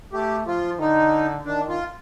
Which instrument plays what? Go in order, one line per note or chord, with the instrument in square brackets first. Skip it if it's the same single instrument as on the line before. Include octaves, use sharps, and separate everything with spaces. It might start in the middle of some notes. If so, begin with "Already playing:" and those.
[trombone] A3 [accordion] G4
[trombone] F3 [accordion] F4
[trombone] D3 [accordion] D#4
[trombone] D#3 [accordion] D4
[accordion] F4